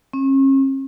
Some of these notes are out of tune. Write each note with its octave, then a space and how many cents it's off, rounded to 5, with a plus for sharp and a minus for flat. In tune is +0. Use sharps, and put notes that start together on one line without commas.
C#4 -40